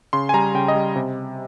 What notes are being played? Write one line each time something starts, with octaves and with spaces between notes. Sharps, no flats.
C#3 C6
G#5
G3 A#5
C#3 G5
D#5
G3
C3